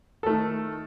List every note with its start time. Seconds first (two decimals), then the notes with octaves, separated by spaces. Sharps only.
0.23 A4
0.26 A3
0.30 D#3